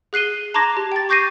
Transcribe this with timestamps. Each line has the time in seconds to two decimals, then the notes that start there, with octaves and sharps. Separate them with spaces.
0.13 G#4 F#6 C7 D#7 G7
0.54 A5 A#5 C6 D6 G#6 A#6
0.77 G4
0.92 G5 A6
1.09 C#6 D6 G6 A#6 C7 D#7